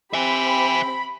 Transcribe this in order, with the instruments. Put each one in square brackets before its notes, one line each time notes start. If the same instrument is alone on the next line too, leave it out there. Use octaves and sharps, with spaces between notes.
[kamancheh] C4 G4 [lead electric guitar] E5 G#5 [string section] B5